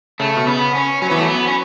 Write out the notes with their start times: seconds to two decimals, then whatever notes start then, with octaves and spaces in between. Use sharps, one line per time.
0.20 C#3 A3
0.37 B2
0.47 C#3 B3
0.75 C#4
1.02 F#3 C#4
1.09 E3 B3
1.17 A3
1.21 F#3
1.26 B3
1.47 C#4